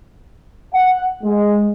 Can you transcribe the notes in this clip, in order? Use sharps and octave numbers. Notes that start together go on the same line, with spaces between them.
F#5
G#3